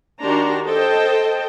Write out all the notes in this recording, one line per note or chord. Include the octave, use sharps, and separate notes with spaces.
D#3 D4 F#4 G4 A#5 C6
A4 C5 D#5 G5 A5